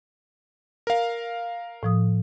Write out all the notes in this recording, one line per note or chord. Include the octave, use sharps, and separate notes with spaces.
A#4 F5
A2 F3 D#6